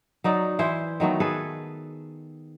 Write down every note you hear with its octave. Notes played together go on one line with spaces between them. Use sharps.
F#3 D#4 D5
E3 E4 C5
D#3 F#3 A3 B3
G#4 A4 B4